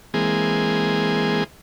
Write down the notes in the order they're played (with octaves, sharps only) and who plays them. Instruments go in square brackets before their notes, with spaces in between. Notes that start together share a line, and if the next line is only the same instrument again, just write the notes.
[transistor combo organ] E3 G#3 A#3 C4 G#4